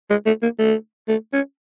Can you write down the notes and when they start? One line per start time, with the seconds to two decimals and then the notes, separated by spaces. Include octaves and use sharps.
0.10 G#3
0.26 A3
0.43 A#3
0.59 A3
1.08 A3
1.33 C#4